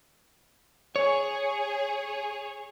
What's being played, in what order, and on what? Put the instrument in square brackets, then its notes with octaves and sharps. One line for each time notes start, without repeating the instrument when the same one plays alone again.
[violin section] G#4 [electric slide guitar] C#5